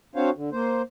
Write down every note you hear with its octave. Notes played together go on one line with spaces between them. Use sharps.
C4 D4 F#4 C5 C#5 F5
D3
A#3 C5